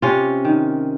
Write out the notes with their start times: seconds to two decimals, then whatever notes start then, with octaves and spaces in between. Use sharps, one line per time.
0.02 C3 C#4 F4
0.45 D#3